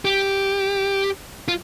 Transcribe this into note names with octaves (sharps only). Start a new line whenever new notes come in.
G4
F4